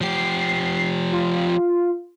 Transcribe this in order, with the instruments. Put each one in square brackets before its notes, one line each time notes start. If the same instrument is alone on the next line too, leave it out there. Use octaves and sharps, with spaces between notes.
[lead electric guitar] F3 G4 [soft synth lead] C7
[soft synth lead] F4